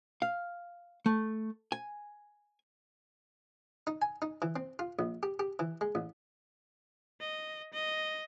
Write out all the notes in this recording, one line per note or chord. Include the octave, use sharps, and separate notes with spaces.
F5
A3
G#5
D#4
G#5
D#4
E3
C4
F4
A#1
G4
G4
E3
G#3
A1
D#5
D#5